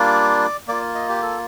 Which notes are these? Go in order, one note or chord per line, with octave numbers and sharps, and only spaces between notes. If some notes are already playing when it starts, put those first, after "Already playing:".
Already playing: G3 A#3 D4 F4 D5
A#3 F4 D5
D#5
G4
A4